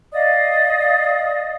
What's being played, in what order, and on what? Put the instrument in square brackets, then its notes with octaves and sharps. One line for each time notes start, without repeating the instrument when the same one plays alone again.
[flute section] D5 D#5 F5 D#6